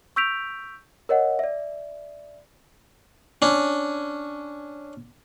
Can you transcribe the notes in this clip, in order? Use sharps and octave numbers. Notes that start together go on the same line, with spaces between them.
C#6 E6 G6 B6 D7 F7
A#4 C#5 D#5 F#5
D5 E5
C#4 D4